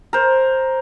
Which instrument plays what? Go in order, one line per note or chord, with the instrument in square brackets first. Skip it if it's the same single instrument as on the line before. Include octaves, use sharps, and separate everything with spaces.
[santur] A#4 C5